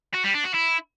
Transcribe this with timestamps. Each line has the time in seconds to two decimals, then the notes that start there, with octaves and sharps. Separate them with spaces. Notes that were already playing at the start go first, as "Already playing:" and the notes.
0.14 F#4
0.24 G3
0.34 D4
0.45 F#4
0.55 E4